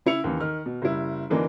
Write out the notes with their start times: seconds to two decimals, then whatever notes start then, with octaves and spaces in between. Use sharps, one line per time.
0.06 C#3 E4 C#7 F7
0.24 D#2 C#3 E3
0.40 D#3 F6
0.66 B2
0.82 F#1 G3 E4
1.30 F#2 D3 E3 A#3 D4 D#4